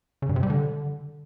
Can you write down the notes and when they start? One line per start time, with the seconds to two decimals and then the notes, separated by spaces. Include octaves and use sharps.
0.22 C#3
0.29 G2
0.36 C3
0.43 G3
0.50 D3